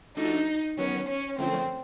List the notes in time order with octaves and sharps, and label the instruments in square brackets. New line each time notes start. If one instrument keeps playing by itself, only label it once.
[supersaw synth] F3 A3 D4 F#4 A4 [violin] D#4
[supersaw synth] D#3 F#3 B3 [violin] C#4
[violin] C#4
[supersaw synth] F#2 D3 F3 A3 C#4 [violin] C4